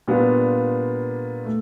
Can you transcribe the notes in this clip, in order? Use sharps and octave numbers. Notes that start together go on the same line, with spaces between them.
A#2 G3 B3 D4 F4
A3